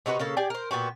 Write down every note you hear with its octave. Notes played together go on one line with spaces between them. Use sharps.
C3 D#4 F#4 B4
C#3 A#3 A4
G4 G#4 D5 G5
A#4 C5
A#2 B3 F#4 G4